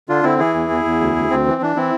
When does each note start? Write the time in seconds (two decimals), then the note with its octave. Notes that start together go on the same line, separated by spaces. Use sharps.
0.09 D3 D4 F4
0.23 D3 C4 E4
0.38 E3 E4 G#4
0.54 E2
0.70 E2
0.85 E2
1.01 D2
1.16 D2
1.30 D2 C4
1.47 E3
1.61 E3 D4
1.76 E3 C4 E4